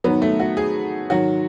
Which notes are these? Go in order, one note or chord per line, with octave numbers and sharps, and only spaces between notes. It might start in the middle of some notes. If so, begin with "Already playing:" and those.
G#2 D#3 F#3 B3
A3
F#4
G#4
G#2 D#3 F#3 F#4